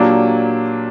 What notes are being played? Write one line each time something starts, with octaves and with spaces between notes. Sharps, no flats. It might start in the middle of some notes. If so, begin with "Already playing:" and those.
Already playing: A#2 F#3 A#3 D4 G4